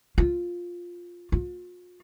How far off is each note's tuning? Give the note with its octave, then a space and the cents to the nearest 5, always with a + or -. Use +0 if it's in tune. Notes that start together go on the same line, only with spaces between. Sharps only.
F4 +5
F4 +40